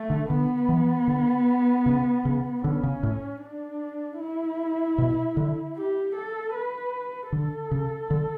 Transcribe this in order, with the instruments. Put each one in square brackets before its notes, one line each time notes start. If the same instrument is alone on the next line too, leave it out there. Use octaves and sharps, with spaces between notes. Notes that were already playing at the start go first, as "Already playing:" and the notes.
Already playing: [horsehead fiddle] A3
[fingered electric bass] D3
[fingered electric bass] D3 [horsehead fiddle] B3
[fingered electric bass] E3
D3
C#3
C#3
[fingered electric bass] D3 [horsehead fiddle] C#4
[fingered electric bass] C#3
A2
[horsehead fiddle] D4
E4
[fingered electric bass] B2
D3
[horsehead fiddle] G4
A4
B4
[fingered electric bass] D3 [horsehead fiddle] A4
[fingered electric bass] C#3
D3